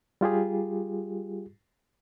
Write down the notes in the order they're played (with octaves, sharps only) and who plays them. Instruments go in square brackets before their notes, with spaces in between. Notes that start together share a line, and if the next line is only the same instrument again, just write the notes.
[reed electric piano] G3 F4 G4 G#4